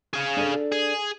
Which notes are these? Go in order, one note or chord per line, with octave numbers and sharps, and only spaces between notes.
G#4 F5
D4 A4 D5
G#4